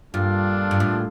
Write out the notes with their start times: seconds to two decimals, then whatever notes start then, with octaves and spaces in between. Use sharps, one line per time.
0.13 G2 A#2 G3 D4 F4 A4
0.71 G2
0.80 A2